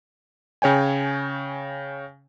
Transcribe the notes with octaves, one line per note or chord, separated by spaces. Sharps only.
C#3 C#5 G5 G#5